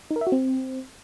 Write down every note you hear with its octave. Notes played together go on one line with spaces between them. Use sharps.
D#4
A#4
E5
F#4
C4